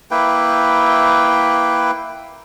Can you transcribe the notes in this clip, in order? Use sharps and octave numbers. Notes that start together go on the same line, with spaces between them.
A#3 E4 B4 G5